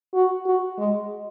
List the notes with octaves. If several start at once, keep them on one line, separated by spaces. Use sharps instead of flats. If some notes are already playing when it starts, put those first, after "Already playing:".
F#4
F#4
G#3